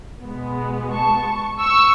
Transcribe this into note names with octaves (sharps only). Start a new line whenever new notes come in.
B2 G#3 B3
A5 C#6
C#6 E6